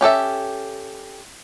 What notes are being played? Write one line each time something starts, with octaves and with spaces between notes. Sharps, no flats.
C#4 G4 A4 E5